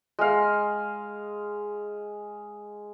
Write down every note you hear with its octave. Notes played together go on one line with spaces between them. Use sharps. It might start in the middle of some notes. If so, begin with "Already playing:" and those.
G#3 F5